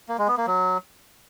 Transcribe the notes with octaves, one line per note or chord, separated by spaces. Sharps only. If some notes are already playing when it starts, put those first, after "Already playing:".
A#3
G#3
B3
A#3
F#3